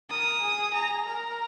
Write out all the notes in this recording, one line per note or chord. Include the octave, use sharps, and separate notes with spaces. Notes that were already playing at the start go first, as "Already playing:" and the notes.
A#4 D#6
G#4
A#5
A#4 A#5